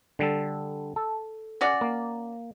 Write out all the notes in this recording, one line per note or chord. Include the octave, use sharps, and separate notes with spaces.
D3 G3 A4
A4
C#4 F#4 D5
A#3